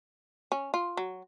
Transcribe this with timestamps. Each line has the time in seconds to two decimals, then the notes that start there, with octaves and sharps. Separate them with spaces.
0.52 C#4
0.74 F4
0.97 F#3